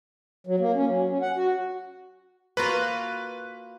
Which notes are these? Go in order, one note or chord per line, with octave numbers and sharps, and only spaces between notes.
F#3
A#3
C#4
F#3
C#4
F#5
F#4
A#3 F4 F#4 B4